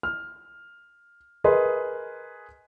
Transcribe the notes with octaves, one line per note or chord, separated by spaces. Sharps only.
F6
G#4 A#4 B4 D#5 C6